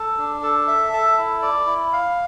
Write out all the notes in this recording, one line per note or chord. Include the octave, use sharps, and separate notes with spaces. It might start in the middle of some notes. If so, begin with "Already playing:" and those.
Already playing: A4
D4
A4
E5
A4
E4
D5
E4
F5